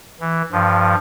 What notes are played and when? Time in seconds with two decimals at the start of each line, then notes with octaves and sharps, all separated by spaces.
0.20 E3
0.52 G2 F3